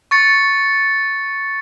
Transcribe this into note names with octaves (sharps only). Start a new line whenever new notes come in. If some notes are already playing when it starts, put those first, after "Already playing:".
C#6 A6 C#7